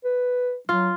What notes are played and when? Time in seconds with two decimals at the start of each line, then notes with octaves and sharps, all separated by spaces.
0.05 B4
0.69 F#3 F4